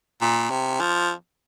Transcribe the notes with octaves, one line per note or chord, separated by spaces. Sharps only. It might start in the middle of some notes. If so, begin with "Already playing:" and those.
A#2
C3
F3